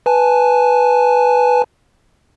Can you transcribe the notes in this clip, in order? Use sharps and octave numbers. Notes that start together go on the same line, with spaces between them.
B4 G#5 A5